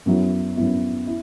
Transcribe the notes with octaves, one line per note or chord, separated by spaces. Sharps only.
F#2 F#3 B3 E4
F#2 F#3 B3 E4
E4